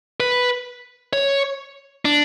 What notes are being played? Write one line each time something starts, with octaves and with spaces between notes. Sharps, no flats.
B4
C#5
D4